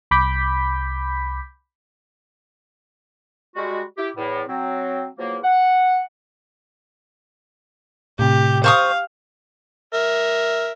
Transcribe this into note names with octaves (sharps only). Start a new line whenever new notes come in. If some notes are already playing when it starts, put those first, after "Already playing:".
C2 B5 D6 G6 B6
G3 G#3 F#4
E4 G4
E2 A2
F#3 C4
E2 F3 F#3 A#3
F#5
A2 C3 G4
C5 F5 C#6 D#6
A#4 E5